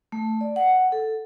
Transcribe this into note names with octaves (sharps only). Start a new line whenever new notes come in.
A3
D5
F#5
A4